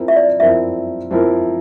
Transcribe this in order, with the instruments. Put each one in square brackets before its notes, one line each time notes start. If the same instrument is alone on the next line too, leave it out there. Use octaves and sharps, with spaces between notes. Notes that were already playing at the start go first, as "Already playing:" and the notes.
Already playing: [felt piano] F3 C4 E4 A#4
[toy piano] E5
D5
[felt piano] F3 C4 E4 A#4 [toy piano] E5
[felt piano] F3 C4 E4 A#4